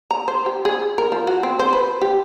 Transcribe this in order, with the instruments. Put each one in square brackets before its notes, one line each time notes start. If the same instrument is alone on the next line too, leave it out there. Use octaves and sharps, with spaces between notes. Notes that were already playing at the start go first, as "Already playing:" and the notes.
[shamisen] A#5
C5
G4
G#4
A#4
F3
F#4
C4
C5
B4
G4